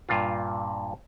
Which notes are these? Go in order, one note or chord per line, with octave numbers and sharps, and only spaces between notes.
G2 A#2 F4